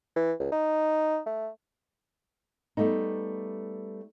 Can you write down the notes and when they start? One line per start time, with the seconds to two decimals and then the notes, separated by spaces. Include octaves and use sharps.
0.16 E3
0.39 C#2
0.52 D#4
1.26 A3
2.77 G3 A3 B3 D#4